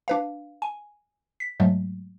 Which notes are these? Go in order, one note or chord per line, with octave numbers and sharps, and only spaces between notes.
D4 B4 F5
G#5
B6
G#2 F#3 G#3 A3